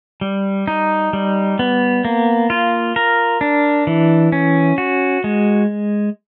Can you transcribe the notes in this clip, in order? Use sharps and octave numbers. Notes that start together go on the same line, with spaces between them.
G3
D#4
G3
B3
A#3
F4
A#4
D4
E3
C#4
F#4
G#3